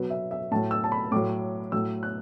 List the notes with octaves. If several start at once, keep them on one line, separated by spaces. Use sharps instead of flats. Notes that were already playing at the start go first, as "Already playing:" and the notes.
Already playing: B2 F#3 B4
E5
E5
A2 F#3 A5
E6
A5
B5
A2 F#3 D6
A2 F#3 E6
F#6